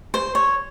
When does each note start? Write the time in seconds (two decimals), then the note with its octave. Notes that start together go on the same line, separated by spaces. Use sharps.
0.14 C5
0.35 C#5